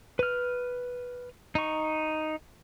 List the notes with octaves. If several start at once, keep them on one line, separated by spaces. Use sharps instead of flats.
B4 F6
D#4 C#6